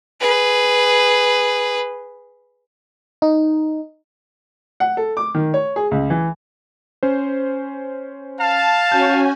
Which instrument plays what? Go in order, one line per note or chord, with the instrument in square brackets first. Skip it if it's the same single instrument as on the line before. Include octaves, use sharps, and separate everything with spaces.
[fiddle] G#4 B4
[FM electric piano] D#4
[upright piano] F#5
A4
D6
D#3
C#5
G#4
C#2
E3
[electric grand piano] C#4 C5
[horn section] F5 A5
[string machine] C#4 F#4 G#5 [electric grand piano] G6